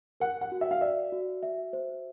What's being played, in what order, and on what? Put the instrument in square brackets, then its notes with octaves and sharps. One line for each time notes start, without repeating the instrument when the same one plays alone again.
[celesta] A#4 [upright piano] F#5
[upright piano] F#5
[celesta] F#4
[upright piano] E5
F5
[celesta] D5 [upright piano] E5
[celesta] F#4
E5
C5